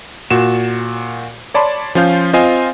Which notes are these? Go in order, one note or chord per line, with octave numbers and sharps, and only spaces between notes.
A#2 F#4 E7
C#5 D5 A5 B5 C6
F3 C#4 F4 F5 G6
C4 F4 C5 D#5 F5 G#5